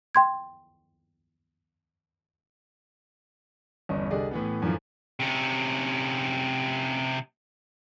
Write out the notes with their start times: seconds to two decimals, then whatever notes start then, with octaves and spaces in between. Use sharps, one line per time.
0.15 G5 C6 G#6
3.89 G1 E2 G2 C#4 D#5
4.10 C2 D3 G4 G#4 D5 D#5
4.31 A2 E3 B3
4.62 F#2 D3 E3 F3
5.20 C3 C#4